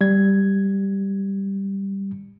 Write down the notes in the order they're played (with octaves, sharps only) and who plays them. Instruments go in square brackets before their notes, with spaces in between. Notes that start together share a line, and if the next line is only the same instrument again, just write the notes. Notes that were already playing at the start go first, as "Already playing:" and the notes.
[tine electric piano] G3 G#6